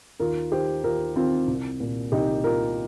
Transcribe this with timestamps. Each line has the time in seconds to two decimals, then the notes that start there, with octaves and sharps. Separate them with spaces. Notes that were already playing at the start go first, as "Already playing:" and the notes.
0.20 D#2 F4 A#4
0.52 D#3 G4 C5
0.84 D#2 F4 A#4
1.15 D#3 C4 F4
1.48 C2
1.80 A#2
2.12 C2 D#4 G4
2.44 A#2 F4 A#4